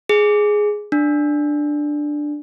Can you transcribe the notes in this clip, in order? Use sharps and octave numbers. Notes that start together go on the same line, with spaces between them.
G#4
D4